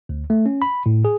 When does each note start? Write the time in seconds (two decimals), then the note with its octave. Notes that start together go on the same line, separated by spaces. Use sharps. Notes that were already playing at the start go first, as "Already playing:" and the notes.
0.09 D2
0.30 A3
0.46 C#4
0.62 B5
0.86 A2
1.05 G#4